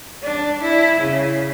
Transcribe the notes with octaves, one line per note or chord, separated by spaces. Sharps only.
D4
E4
C#3